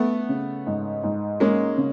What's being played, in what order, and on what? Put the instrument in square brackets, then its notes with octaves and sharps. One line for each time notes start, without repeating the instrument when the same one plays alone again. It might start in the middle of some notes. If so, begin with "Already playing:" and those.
Already playing: [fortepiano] A3 B3
[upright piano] C#3
G#2
G#2
[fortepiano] G#3 A#3 [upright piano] C#4
[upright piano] C#3